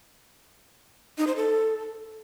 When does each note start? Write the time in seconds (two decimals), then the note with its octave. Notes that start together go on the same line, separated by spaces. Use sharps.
1.18 D#4
1.27 C5
1.36 A4